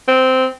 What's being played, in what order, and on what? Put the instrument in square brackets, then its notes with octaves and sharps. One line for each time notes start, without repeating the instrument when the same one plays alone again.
[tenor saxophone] C4